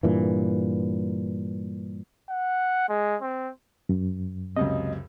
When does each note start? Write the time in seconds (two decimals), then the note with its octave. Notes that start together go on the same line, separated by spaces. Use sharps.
0.03 G2 A#2 E3
2.29 F#5
2.89 G#3
3.22 C4
3.89 F#2
4.57 C#2 F#2 C3 D#5